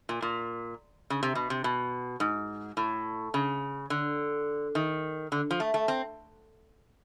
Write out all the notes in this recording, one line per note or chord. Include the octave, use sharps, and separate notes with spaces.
A#2
A#2
C#3
C3
B2
C3
B2
G#2
A2
C#3
D3
D#3
D3
F3
A3
A3
C4